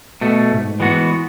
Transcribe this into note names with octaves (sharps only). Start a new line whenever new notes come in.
B2 A3
G#2
E3 G#3 B3 F#4